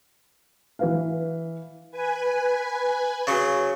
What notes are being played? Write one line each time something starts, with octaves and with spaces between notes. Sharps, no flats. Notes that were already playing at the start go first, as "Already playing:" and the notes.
E3 B4 F5
B4 G#5
C#3 F#3